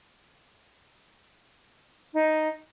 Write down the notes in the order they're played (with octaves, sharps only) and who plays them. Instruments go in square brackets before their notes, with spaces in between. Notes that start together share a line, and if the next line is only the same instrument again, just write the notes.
[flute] D#4